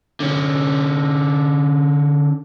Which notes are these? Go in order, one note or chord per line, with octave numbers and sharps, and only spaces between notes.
D3 C#4